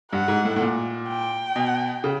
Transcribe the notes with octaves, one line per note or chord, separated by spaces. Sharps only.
G2 F#5
G#2
A2
A2
A#2
G5
B2
C#3